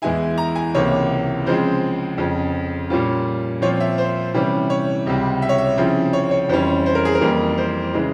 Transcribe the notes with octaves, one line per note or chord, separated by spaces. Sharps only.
E2 E3 G#3 E4 G#5
A#5
G#5
C#2 C3 E3 A#3 C#5
C#3 F3 G#3 C4 C5
F2 C#3 F3
A#2 G3 C#4 F4
A#2 F3 C4 F4 C#5
E5
C5
C3 E3 G3 C#4
C#5
C#2 C3 G3
E5
C#5
E5
C#3 F3 C4 E4
C#5
C#5
F2 E3 G3 C#4 C5
C5
A#4
G#4
A#4
F2 E3 G3 A#3
C5
C#3 E3 G#3